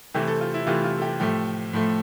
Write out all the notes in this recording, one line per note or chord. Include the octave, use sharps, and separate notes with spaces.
C3 E3 A3 C4 G4
A4
F4
E4
C3 E3 A3 C4 F4
F4
A4
G4
A2 F3 A3 G4
A2 F3 A3